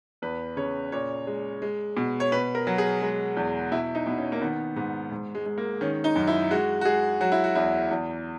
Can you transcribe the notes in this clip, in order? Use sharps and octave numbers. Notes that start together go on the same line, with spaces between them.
E2 B4
C#3 C#5
A#2 C#5
G#3
G#3
B2
C#5
B2 B4
A#4
F#3
G#4
G#3
E2
B2 E4
D#4
B2
C#4
A#3
D#3 B3
G#2 B3
G#2
G#3
G#3
A#3
D#3 C#4
D#4
F#2
E4
G#3 F#4
F#4
G#3 G#4
F#3 F#4
E4
F#4
E2 E4
E2